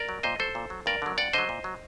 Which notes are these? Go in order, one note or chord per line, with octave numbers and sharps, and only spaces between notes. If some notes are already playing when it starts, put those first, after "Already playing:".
Already playing: A#4 D5
F#3
A#2 C5 D#5
F#3 A4 C5
A#2
F#3
G2 A#4 D5
D3 F#3
G2 D5 F#5
D3 F#3 C5 D#5
A#2
F#3